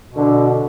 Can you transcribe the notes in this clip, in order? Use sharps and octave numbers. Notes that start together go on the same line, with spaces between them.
B2
D3